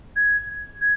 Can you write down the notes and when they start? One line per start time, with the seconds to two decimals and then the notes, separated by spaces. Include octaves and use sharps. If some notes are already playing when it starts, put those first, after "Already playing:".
0.16 G#6
0.81 G#6